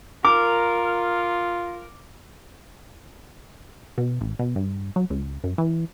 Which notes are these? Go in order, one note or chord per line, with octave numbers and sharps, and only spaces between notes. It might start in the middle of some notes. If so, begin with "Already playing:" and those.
F4 A#4 D6
B2
A1
B2
G2
F#3
C#2
F#2
E3